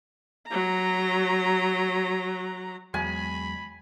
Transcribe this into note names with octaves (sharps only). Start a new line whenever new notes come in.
F#3 A#5
E2 F#3 G#3 G#5 B5